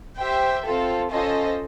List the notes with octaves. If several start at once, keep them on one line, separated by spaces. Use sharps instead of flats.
G4 C5 E5 G5
C4 F4 A4
C#4 F4 A4 C5 D#5